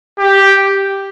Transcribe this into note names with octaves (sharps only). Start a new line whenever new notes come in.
G4